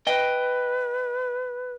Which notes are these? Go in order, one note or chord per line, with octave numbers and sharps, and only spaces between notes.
B4 D#5 G5